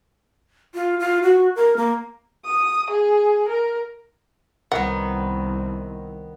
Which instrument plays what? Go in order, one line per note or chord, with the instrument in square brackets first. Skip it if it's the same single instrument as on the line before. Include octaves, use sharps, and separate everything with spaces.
[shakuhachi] F4
F4
F#4
A#4
A#3
[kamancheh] D#6
G#4
A#4
[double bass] C2 [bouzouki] D#3 B3 [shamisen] F#5